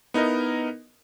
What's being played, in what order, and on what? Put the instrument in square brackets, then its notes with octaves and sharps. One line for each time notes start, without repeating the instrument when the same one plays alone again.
[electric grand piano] B3 D#4 E4 A#4 D#5